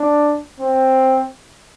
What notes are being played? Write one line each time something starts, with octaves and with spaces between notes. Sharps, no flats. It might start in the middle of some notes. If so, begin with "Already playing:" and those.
Already playing: D4
C4